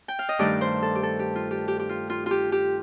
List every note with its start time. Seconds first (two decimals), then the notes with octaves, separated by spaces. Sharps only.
0.08 G5
0.19 F5
0.29 D#5
0.39 G2 D#3 A3 D5
0.61 C5
0.82 A4
0.95 G4
1.03 A4
1.19 G4
1.35 F4
1.51 G4
1.68 G4
1.79 G4
1.89 F4
2.10 F4
2.26 F4 G4
2.52 G4